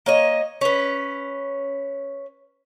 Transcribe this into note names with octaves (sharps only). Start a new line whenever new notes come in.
A#3 C#5 D#5
C#4 B4